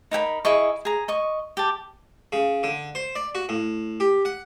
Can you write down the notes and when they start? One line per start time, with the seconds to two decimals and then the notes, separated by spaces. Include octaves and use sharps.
0.11 D#4 A#4 G5 B5
0.45 E4 G#4 D#5 C#6
0.85 G#4 A#5
1.08 D#5 C#6
1.57 G4 A5
2.32 C#3
2.63 D3
2.95 C5
3.16 D5
3.35 F#4
3.49 A2
4.00 G4
4.25 F#5